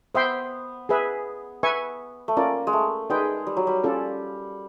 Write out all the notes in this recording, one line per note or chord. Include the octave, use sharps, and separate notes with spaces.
B3 C5 E5 G5 C6
G#4 B4 E5
B4 E5 G#5 C#6
A3
A#3 C#4 F4 A#4 D5
G#3
A3
G#3 D#4 G#4 B4 D5 G5
G3
F#3
G3
C#4 F4 A4 D5